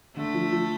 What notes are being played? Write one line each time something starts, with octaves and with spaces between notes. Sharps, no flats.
D3 A3
F3
F3